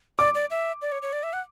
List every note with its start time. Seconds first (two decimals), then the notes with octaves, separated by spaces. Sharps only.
0.19 D5 D6
0.35 D5
0.50 E5
0.82 D5
0.92 C#5
1.02 C#5
1.13 D5
1.23 E5
1.33 F#5